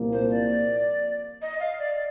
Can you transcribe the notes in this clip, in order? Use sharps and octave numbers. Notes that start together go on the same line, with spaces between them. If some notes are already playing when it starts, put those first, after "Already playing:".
Already playing: C2 A#2 F3 A#3
C5
D5
D#5
F5
D5